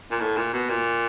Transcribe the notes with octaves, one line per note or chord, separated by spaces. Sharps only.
A#2
A2
A#2
B2
A#2